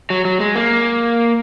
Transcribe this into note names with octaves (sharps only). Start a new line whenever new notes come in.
F#3
F#3
G#3
A#3